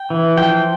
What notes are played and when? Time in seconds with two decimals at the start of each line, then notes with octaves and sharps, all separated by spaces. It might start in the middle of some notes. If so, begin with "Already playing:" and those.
Already playing: G5
0.10 E3
0.37 F3 G5